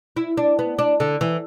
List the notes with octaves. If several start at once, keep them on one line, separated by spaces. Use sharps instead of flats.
E4
D4
B3
D4
D3
E3